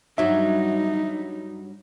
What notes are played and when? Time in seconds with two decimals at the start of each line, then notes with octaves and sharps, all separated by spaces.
0.18 G2 F#3 D#4 E5